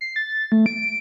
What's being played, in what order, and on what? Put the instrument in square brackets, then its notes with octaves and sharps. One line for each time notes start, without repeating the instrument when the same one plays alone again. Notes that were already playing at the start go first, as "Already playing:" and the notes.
[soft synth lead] C7
A6
A3
D7